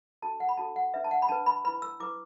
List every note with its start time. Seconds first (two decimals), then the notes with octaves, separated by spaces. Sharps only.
0.22 D4 F#4 A4 A5
0.40 F#5
0.49 B5
0.57 D4 F#4 A4 A5
0.76 F#5
0.94 D4 B4 E5
1.04 A5
1.11 F#5
1.22 B5
1.29 D4 B4 A5
1.46 B5
1.64 E4 B4 B5
1.82 E6
2.00 E4 B4 D6